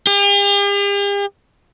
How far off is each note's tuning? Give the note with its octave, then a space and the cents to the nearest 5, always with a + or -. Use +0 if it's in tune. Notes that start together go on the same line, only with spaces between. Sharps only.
G4 +45